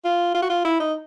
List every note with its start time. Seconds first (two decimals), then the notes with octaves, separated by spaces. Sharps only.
0.04 F4
0.34 F4
0.43 F#4
0.50 F4
0.65 E4
0.80 D#4